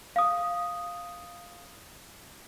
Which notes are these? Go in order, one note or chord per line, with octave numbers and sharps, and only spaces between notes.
F5 D#6